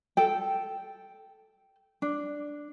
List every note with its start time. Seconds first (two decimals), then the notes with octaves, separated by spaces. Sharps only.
0.17 A4 G5
2.02 D4